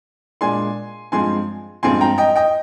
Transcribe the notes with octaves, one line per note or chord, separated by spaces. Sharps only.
A#2 G#3 D4 G#5 C6
G2 F3 G#3 C4 G#5 C6
G2 F3 G#3 C4 G#5 C6
G5 A#5
D#5 G5
D#5 G5